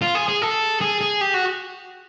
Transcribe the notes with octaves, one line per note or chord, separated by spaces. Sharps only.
F4
G#4
G#4
A4
G#4
G#4
G4
F#4